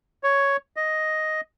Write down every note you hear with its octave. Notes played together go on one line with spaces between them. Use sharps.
C#5
D#5